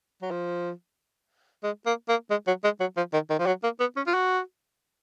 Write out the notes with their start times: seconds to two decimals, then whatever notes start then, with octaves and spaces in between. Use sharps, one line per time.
0.22 F#3
0.31 F3
1.64 G#3
1.86 A#3
2.08 A#3
2.30 G#3
2.47 F#3
2.64 G#3
2.80 F#3
2.97 F3
3.13 D#3
3.30 D#3
3.39 F3
3.46 F#3
3.63 A#3
3.80 B3
3.97 C#4
4.07 F4
4.14 F#4